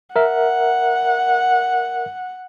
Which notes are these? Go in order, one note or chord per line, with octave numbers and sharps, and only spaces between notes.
A#4 E5 F#5